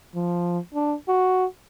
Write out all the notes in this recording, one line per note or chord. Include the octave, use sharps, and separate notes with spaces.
F3
D4
F#4